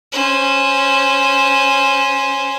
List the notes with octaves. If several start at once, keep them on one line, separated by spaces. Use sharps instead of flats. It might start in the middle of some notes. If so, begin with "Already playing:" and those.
C#4 C5